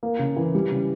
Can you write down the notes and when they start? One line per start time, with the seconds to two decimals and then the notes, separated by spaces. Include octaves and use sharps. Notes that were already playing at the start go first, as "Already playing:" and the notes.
0.03 A#3
0.19 C#3
0.36 E3
0.55 G3
0.71 C#3